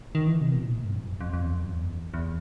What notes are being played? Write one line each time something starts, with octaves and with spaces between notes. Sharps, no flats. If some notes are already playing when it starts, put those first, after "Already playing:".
D#3
E3
C3
B2
A#2
A2
G2
F#2
F2
F2
F2
E2
F2
F#2
E2
E2